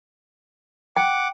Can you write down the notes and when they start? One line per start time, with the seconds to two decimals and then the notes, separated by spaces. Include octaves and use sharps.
0.96 F#5 G5 D6